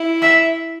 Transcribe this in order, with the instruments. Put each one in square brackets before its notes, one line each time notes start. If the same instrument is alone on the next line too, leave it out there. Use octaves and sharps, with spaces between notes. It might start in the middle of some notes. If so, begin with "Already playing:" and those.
Already playing: [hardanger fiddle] E4
[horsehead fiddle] E5